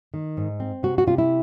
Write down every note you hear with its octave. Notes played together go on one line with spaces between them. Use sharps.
D#3
G#2
C4
C3 F#4
F#4
C3 F4
E4